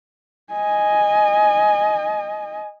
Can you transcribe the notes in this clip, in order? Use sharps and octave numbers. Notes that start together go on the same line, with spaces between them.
D#5 G#5